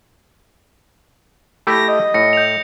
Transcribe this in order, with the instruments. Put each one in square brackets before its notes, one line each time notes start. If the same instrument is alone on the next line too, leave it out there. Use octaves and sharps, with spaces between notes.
[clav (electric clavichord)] A3 E4 G4 [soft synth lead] A#6
[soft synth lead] D#5
[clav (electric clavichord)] A2 [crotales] A#6 C#7
[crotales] G6 F7